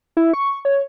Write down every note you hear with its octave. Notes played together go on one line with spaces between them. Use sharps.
E4
C#6
C#5